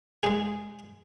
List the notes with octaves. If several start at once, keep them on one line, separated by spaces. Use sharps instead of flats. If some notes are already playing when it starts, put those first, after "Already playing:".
G#3 D#4 G#4